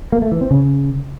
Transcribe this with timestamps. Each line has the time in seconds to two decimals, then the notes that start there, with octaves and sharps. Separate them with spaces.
0.12 A#3
0.22 A3
0.32 E3
0.41 C4
0.51 C#3